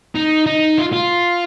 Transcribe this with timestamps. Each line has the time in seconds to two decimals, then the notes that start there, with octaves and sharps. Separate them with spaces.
0.15 D#4
0.46 D#4
0.78 F4
0.93 F4